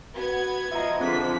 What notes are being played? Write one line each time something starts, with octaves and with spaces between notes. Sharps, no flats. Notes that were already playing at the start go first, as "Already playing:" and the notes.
B3 F#4 G#6
F3 D#5 E5 A#5
D3 F3 C4 G#4 B6